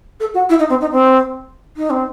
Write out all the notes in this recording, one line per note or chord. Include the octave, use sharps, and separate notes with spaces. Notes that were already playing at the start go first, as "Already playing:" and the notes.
A4
F#4
E4
D#4
C4
D#4
C4
D#4
C4